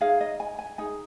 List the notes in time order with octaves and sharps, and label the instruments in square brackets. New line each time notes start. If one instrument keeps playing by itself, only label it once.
[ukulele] D#4 G#4 F5
D#5
G#5
G#5
D#4 G#4 G#5